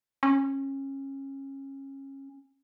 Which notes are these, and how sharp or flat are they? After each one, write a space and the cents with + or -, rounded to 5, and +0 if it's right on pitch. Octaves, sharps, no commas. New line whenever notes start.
C#4 -25